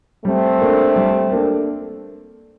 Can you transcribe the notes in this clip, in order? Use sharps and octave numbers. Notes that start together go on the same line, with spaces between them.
G3 A3 C4
A#3 D4 A4
G3
A#3 D4 A4